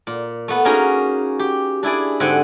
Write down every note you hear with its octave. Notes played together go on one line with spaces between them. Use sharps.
A#2
A3 B3
A#3 C#4 D#4 F#4 G#4 A#4
G4
D4 E4 G#4 D5
G#2 D3 C4 G4 F#5 G#5